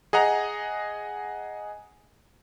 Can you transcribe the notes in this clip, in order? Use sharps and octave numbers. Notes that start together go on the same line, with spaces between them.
G#4 D#5 F#5 A#5